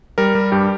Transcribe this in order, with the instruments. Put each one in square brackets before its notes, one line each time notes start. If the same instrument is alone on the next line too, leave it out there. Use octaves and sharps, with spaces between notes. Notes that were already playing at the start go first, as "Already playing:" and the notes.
[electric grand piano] G3 A#4
G3
G2 G4